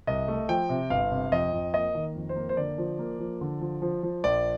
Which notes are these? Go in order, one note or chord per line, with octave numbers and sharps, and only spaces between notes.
C2 D#5
A3
F3 G5
C3
G1 F5
C3
F2 D#5
F2
A#3 D#5
D#3
F2
C5
A#3
C5
D3 D5
F3
A#3
F3
D3
F3
F3
F3
A#1 D5